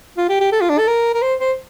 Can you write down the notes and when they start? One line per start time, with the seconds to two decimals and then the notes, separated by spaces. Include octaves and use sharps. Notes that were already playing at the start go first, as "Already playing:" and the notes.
0.17 F4
0.29 G4
0.40 G4
0.52 A4
0.61 F4
0.69 D4
0.78 A4
0.87 A#4
1.14 A#4
1.22 C5
1.40 C5